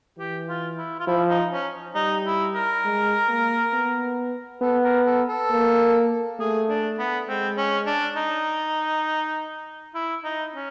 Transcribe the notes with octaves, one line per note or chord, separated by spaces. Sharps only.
E3 G4
F4
E4
F4
F3 E4
D#4
C#4
G3 D#4
E4
A#4
G#3
A#3
B3
B3 A4
A#4
A4
A4
A#3
A3 G#4
D4
B3
G#3 C4
C#4
D4
D#4
E4
D#4
C#4